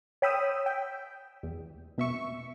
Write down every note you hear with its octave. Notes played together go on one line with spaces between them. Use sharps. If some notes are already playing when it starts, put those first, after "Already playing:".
C#5 G5 B5 D#6 E6
G5
E2
B2 E5 C#6